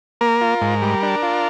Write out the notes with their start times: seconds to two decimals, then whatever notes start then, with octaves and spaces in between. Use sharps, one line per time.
0.21 A#3 A#4
0.41 F4
0.61 G#2
0.82 G3
1.03 D4
1.23 F4